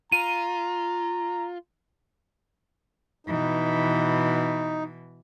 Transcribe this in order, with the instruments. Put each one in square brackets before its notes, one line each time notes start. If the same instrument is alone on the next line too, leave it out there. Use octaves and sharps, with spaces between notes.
[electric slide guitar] F4 [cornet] A#5 [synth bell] D#7
[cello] B2 E3 [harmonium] D#4